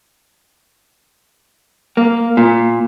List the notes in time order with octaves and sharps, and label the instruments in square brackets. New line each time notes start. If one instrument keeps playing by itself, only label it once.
[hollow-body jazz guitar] A#3
A#2